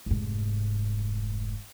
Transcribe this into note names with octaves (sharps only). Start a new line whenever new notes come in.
F1 G#2